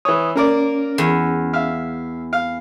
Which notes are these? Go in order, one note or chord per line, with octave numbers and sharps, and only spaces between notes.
E3 C#5 D#6
A#3 C#4 A#4 D5
E2
E5 F5
F5